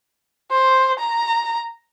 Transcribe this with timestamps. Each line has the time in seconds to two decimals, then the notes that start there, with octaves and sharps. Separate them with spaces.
0.51 C5
0.99 A#5